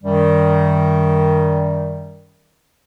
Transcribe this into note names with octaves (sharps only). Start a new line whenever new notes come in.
F#2 D#3 G3